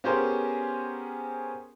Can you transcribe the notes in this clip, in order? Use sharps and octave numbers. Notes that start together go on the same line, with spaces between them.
B3 C#4 G4 G#4 A#4 C5